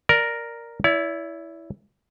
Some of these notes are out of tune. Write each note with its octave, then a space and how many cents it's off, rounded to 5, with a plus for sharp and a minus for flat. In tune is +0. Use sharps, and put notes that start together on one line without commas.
A#4 +0 D5 +5
E4 +0 D5 -45